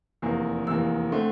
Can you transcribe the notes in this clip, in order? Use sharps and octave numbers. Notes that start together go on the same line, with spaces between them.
F1 E2 E3 A#3
F1 E2 E3 A#3 E6
D3 A3 C4